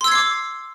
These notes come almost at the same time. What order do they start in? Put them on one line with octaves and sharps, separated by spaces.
C6 E6 G#6 C7 D6